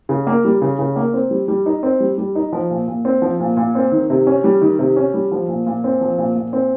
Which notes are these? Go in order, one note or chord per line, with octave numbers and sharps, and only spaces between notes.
C#3
A#3
G3
C#3
C#3
A#3
C4
G3
G3
D#4
C4
G3
G3
D#4
F3
A#2
A#2
C4
F3
A#2
A#2
C4
D#3
C3
C#4
G3
D#3
C3
C#4
G3
F3
A#2
A#2
C4
F3
A#2
A#2
C4